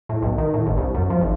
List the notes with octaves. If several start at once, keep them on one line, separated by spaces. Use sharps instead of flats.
A2
B1
D#3
A2
G1
C2
F#2
F3
G#1